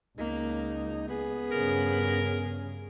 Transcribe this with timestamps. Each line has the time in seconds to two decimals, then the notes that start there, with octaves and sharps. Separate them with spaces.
0.18 C#2 A#3 D#4
1.08 B3 G#4
1.52 G2 C#3 A#4